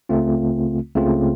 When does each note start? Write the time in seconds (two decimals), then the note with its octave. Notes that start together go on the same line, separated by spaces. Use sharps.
0.09 C#2 C#3 A3 C4 F4
0.95 C#2 C#3 A3 C4 F4